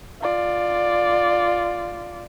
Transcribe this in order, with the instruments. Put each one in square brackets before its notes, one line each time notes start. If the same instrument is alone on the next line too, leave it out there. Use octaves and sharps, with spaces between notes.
[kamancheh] F4 D5